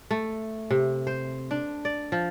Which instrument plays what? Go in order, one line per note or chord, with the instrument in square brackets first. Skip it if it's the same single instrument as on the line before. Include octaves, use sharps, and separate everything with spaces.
[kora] A3
C3
C5
D4
D5
F3